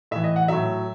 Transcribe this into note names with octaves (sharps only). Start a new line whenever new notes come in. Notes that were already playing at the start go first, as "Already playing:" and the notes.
A2 E3 E5
D#5
F#5
A2 F#3 E5